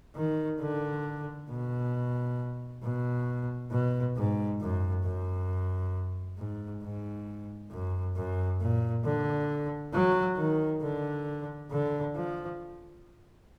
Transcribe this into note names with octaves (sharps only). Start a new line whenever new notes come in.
D#3
D3
B2
B2
B2
G#2
F#2
F#2
G#2
G#2
F#2
F#2
A#2
D3
F#3
D#3
D3
D3
F3